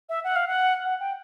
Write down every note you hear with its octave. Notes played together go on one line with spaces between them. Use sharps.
E5
F#5
F5
F#5
F#5
G5